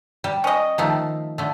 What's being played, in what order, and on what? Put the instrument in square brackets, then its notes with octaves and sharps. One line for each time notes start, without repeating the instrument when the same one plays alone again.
[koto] G3
[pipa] C#4 D#5
[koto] D#3 F3 A3
D3 A3